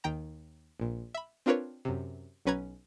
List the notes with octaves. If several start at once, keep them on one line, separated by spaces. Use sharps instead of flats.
D#2 D#3 G5 A#5
A#1 A#2
E5 B5
C4 D4 F4 A#4 B4 C#5
F#2 C3
B1 F#3 C#4 B4 A#5 G#6